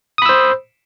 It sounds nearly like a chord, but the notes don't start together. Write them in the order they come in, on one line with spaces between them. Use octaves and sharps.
D#6 B5 E6 C5